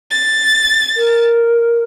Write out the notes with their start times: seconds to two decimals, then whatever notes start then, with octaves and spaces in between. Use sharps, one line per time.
0.11 A6
0.97 A#4